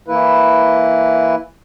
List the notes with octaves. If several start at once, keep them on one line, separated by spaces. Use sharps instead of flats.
E3 A#3 E4 B4